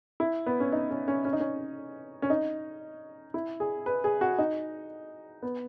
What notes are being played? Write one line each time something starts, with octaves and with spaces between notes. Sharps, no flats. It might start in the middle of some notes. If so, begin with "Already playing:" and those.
E4
B3
C#4
D#4
C#4
C#4
C#4
D#4
C#4
C#4
D#4
E4
G#4
B4
G#4
F#4
D#4
B3